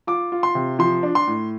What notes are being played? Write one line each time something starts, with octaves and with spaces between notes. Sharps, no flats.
F4 D6
F4
C6
C3
F3 C6
D4
C6
A2